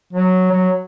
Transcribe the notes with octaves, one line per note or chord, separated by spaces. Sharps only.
F#3
F#3